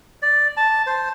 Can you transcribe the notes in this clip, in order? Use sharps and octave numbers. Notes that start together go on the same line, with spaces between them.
D5
A5
C5